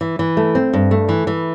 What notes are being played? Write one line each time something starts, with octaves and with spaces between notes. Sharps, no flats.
E3
E3
A3
C4
G2
A3
E3
E3